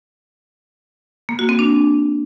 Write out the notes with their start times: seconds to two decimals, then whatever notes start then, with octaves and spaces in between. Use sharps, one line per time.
1.29 A#3
1.39 F#4
1.49 C4
1.59 D4